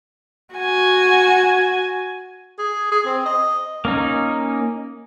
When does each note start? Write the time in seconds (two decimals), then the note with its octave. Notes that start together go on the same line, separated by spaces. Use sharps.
0.55 F#4 G#5
2.59 G#4
2.91 G#4
3.06 C4
3.26 D#5
3.85 A#3 C#4 D#4